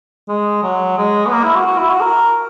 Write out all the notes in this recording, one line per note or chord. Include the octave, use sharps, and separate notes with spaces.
G#3
F#3
G#3
B3
A#3
E4
F#4
F#4
E4
F#4
A#4